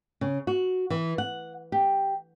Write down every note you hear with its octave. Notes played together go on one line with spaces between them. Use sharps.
C#3
F#4
E3
F#5
G4